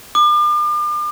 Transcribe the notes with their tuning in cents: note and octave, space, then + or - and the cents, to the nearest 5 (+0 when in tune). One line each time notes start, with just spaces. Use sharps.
D6 +40